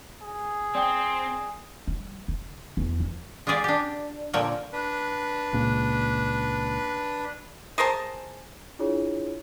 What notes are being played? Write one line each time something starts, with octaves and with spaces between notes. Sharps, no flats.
G#4
C4 D5 G5 D#6
G3
C#3
E2
E3
G#3 F4 G4 G#4 D5
D4 G4
A#2 D3 F3 A#4 C#5 G5
D4 B4
C#2 A#2 C#3
G#4 A#4 C5 A5
D4 E4 F4 G#4 C#5